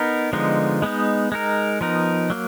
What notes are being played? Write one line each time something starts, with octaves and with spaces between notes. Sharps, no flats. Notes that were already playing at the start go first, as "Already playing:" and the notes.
Already playing: B3 D#4 A#4
D3 F3 G#3 B3 D#4
G#3 B3 D#4
G#3 D#4 A#4
F3 B3 D#4 A#4
F#3 A#3